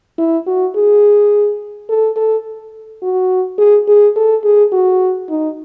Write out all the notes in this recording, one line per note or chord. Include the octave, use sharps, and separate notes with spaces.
E4
F#4
G#4
A4
A4
F#4
G#4
G#4
A4
G#4
F#4
D#4